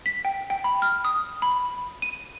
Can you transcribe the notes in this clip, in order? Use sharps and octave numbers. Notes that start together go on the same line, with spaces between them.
B6
G5
G5
B5
F6
D#6
B5
D#7